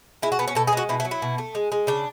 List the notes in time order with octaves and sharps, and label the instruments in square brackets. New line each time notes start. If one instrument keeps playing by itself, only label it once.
[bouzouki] G#3 E4
F#4
B2 B3
C#4
B2 A4
G#4
G#3 F#4
B2 E4
E4
F#3
E4
B2
A3
G#3
G#3
C#3 D4